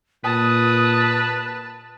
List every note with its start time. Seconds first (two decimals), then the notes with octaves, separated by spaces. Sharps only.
0.24 A#2 B4 A5 D#6